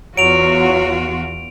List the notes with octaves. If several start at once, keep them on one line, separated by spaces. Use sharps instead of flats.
E2 F#3 F4 F#4 D7 F7